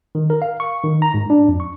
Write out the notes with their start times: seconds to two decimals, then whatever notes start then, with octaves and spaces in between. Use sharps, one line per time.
0.15 D#3
0.30 A#4
0.42 F5
0.60 C#6
0.83 D#3
1.02 A#5
1.14 G#2
1.30 D4
1.48 F2
1.60 C#6